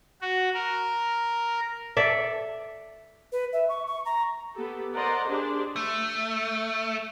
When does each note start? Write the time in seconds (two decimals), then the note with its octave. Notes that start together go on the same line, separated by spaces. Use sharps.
0.21 F#4
0.54 A#4
1.97 A4 D5 E5
3.32 B4
3.53 E5
3.69 C#6
3.87 C#6
4.05 A#5
4.55 B3 G4 A4
4.94 A#4 C5 D5 D#5 F#5 A#5
5.27 D4 G4 G#4 C5 D5
5.76 A3